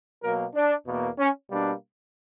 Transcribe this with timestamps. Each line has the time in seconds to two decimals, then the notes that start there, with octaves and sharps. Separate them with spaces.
0.23 B2 F#3 A#3 A#4
0.55 D4
0.87 E2 B2 A#3
1.19 C#4
1.50 B2 G3 A#3 D4